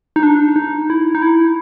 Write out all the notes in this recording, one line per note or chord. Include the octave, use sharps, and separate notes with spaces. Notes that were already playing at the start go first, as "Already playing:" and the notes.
D#4
D4
D#4
E4
D#4
E4